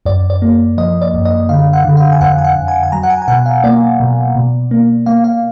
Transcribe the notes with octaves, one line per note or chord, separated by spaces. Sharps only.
F#2 D5
D5
A#3
F3 D#5
D5
F#2
D#5
D3 F5
F#5
D3
F5
G#5
F2 F#5
G#5
F#5
F2
G#5
G#5
F#3 A#5
F#5
G#5
G#5
B2 F#5
F5
A#3 D5
B2
B2
A#3
A#3 F5
F5